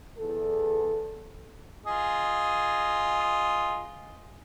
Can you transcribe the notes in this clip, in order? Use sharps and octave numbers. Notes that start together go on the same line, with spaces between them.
E2 A4
F4 G#4 D#5